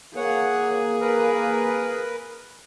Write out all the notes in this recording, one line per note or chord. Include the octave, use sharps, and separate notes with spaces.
A#3 G#4 C#5 F#5
A#4 B4